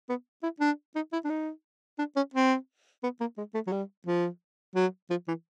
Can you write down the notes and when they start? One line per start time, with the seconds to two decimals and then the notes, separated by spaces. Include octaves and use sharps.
0.09 B3
0.43 E4
0.60 D4
0.95 D#4
1.13 E4
1.25 D4
1.30 D#4
1.99 D4
2.16 C#4
2.34 C4
3.03 B3
3.20 A#3
3.38 G#3
3.54 A3
3.67 F#3
3.72 G3
4.06 F3
4.75 F#3
5.10 F3
5.28 E3